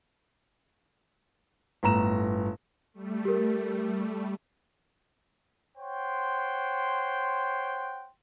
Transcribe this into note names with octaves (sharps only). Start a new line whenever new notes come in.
G1 A2 A#5 E7
G3 A3
G4 A#4
C5 C#5 F#5 G5 C6